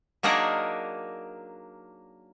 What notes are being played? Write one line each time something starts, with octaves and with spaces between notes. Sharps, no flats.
F#3 A#3 D4 D#4 G#4 A#4